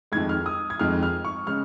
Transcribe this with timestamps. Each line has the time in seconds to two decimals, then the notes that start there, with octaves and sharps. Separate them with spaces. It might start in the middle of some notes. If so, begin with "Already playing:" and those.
0.12 F2 D#3 G#3 G#6
0.29 F6
0.46 D#6
0.70 G#6
0.79 F2 D#3 G#3 F6
1.03 F6
1.25 C#6
1.47 C#3 G#3 F6